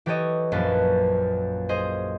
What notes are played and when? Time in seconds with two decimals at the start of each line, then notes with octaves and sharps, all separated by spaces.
0.06 E3 G4 A4 C#5 D#5
0.52 A#1 F#2 A#3 B4 A5
1.69 G#4 C5 D#5